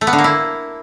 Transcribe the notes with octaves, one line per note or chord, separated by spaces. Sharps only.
A3
B3
D3
A#3
E4